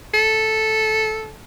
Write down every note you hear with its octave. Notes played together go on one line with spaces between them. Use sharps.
A4